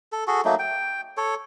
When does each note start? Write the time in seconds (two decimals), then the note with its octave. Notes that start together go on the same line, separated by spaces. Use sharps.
0.12 A4
0.28 F#4 G#4 A4
0.45 F#3 A3 A#3 D#4
0.59 G5
1.17 A4 C#5